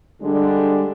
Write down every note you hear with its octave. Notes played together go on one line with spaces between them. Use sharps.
D3 G3 G#3 D4